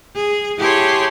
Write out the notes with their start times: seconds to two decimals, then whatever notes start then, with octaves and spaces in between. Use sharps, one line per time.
0.16 G#4
0.59 E4 G4 G#4 C#5 A5 C6